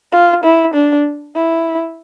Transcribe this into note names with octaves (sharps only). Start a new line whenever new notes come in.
F4
E4
D4
E4